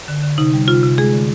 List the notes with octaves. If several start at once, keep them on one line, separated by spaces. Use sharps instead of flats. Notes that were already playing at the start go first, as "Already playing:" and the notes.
D3
D3
C3 D#4
G3
C3 F4
C3
G#3 G#4
D3